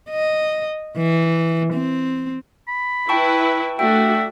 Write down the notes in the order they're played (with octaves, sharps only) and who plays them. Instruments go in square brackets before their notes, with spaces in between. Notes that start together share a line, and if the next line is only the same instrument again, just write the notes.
[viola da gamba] D#5
E3
C4
[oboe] B5
[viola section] E4 B4 [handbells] G5 A5 C#6
[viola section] A3 D4 F#4 [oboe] E5 [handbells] G5